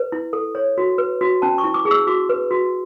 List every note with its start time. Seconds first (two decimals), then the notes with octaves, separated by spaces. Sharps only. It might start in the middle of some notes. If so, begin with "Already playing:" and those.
Already playing: B4
0.12 E4
0.33 A4
0.55 C#5
0.78 F#4
0.98 B4
1.21 F#4
1.42 C#4 A5
1.58 C#6
1.64 E4
1.74 D6
1.85 G#4
1.91 E6
2.07 F#4 D6
2.29 B4
2.51 F#4